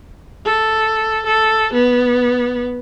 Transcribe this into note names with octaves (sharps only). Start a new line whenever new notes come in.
A4
A4
B3